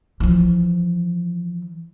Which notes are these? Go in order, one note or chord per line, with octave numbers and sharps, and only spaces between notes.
E3 F3